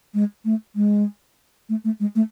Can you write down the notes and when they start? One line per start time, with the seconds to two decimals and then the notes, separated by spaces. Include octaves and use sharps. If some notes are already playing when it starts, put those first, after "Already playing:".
0.14 G#3
0.45 A3
0.76 G#3
1.69 A3
1.85 A3
2.00 G#3
2.16 A3